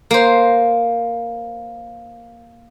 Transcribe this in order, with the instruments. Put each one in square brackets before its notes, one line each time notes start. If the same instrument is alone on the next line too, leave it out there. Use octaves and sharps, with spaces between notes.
[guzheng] A#3 C5